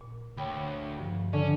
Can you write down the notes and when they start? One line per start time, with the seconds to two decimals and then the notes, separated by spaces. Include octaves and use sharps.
0.01 A#2
0.37 D2 C#5 G5 B5
0.98 G2 D3 F3
1.33 D3 C#4 D5